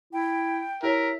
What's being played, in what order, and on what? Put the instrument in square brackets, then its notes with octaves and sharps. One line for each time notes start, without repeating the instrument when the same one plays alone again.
[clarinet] E4 [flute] G5
[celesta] E4 G4 C#5 [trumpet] A#4 [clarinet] E5